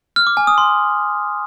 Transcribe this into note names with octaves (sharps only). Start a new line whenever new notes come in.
F6
D6
G#5
D#6
C6